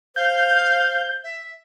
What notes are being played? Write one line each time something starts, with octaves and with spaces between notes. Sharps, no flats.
C5 F5 G6
E5